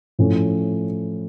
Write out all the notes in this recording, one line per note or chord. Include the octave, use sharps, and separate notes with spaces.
A2 F3 A3 C#4